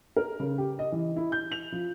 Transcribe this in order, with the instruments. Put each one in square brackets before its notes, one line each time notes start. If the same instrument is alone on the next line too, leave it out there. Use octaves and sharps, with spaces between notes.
[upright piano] A#4
C#3
G4
D#5
E3
E4
G6
F7
F3